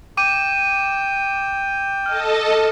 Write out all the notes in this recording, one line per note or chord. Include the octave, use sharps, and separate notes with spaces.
G5 D6 D#7
A4 D#5 A5 F6